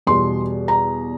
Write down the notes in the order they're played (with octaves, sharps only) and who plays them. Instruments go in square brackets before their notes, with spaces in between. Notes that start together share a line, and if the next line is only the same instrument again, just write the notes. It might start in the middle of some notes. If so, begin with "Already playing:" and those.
[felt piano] E2 B2 G3 C6
A#5